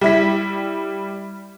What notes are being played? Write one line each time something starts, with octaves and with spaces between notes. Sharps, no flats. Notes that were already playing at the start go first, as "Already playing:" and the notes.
G3 E4 B6